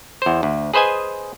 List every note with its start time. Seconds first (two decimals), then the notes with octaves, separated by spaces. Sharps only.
0.22 E2 C5
0.43 D2
0.74 G#4 B4 C5 D#5 G#5